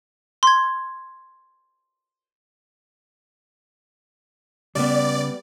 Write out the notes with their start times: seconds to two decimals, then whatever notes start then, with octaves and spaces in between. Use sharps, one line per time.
0.43 C6 G#6
4.75 C#3 G3 B3 D5